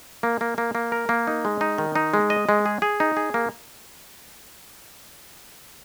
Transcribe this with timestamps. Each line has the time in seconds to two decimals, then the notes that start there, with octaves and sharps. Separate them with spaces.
0.23 A#3
0.41 A#3
0.58 A#3
0.75 A#3
0.92 A#4
1.09 A#3
1.27 D#4
1.45 G#3
1.61 D#4
1.78 D#3
1.95 D#4
2.14 G#3
2.30 D#5
2.49 G#3
2.66 G#4
2.82 G#4
3.00 D#4
3.17 G#4
3.34 A#3